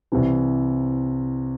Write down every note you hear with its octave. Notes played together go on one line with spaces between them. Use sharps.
C2 C3 E3